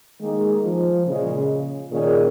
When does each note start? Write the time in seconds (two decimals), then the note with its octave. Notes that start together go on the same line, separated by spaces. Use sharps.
0.21 D#3 G#3 A#3 D#4 G#4
0.64 F3
1.06 A#2 C#3 G#3 C#4 G#4
1.92 A#2 D#3 C#4 G#4